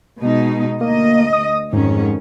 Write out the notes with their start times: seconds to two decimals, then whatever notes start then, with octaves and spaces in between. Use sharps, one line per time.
0.20 B2 G#3 D#4
0.81 D2 A#3 D#5
1.33 D#6
1.73 F2 G#2 D#3 C#4